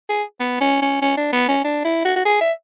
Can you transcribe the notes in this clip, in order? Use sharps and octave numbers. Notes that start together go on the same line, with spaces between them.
G#4
B3
C#4
C#4
C#4
D4
B3
C#4
D4
E4
F#4
F#4
G#4
E5